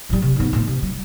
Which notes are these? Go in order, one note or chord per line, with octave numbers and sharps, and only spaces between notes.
A#1 G3
C3
G#2 B3
D2 A#2
C3
G3